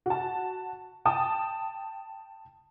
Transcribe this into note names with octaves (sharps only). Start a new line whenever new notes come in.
F#4 A5
G5 A5 D#6